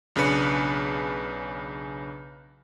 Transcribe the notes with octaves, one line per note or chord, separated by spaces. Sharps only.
B1 C#3 D4 B4 C#7